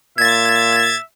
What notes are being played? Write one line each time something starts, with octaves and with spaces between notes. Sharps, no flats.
A#2 E5 G#6 A6